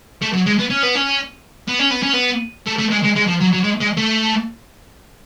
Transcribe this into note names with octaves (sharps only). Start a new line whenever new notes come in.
A3
F#3
G#3
B3
C#4
B3
C#4
B3
C#4
B3
C#4
B3
A3
A3
G#3
G#3
G#3
F3
F#3
F#3
G#3
G#3
A3